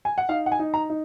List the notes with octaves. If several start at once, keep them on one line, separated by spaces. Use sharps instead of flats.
G#5
F#5
D#4 F5
F#5
G#5
D#4
A#5
D#4